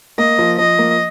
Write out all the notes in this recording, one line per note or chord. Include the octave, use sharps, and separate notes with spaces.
A#3 D#5
F3
F3 D#5
A#3